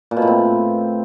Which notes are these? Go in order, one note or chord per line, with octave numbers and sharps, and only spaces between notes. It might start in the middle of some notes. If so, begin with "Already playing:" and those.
A#2
B2
A2
C4